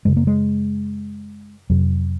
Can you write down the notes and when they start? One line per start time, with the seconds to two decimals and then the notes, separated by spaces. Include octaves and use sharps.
0.05 F#2 C#3 G#3
0.16 A#3
0.27 G#3
1.70 F2 C3 F#3